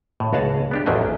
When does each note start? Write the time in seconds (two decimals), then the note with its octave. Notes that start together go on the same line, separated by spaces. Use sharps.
0.20 A2
0.33 C#2 F#4 G#4 C#5 F#5 A5
0.71 B3 D4 G4
0.86 A1 E2 F3 F#3 G#4 D#5